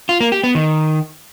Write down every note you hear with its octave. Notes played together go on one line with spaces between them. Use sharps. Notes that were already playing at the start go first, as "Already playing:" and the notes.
F4
A#3
G4
B3
D#3